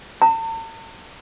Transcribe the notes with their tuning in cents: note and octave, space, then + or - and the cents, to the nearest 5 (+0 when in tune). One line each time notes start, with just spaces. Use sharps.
A5 +45